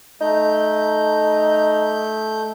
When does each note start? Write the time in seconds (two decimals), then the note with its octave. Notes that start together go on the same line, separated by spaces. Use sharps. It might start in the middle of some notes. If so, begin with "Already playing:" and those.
0.21 A3 D#4 G6